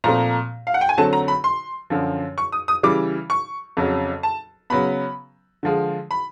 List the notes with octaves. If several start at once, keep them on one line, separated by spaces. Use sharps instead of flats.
A#2 F3 A3 C4 A#5
F5
F#5
G5
G#5
D3 F#3 A3 C4 A5
A#5
B5
C6
F#2 D3 F3
C#6
D#6
D#6
C#3 E3 G3 D6
C#6
F2 C#3 F#3
A5
C#3 F#3 B3 B5
D3 F3 G#3
B5